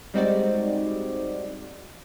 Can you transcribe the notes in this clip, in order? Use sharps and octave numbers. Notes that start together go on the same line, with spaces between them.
G3 G#3 C4 D#4 F#4 D5